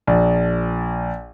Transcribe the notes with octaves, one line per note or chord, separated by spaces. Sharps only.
A#1